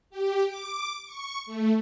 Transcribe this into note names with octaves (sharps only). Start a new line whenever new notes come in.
G4
D6
C#6
A3